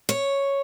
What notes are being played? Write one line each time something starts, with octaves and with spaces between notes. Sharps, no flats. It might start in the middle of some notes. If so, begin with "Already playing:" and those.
C#5